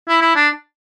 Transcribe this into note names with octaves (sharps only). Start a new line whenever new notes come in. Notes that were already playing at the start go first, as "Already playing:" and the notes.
E4
E4
D4